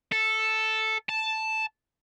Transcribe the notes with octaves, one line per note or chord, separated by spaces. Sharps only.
A4
A5